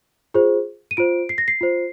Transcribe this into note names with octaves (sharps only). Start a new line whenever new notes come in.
F4 G#4 C5
D#7
F4 C5 D7
C7
A#6
C7
F4 C5